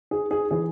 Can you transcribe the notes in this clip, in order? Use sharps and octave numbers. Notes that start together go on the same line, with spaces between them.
G#4
G#4
E3 G#4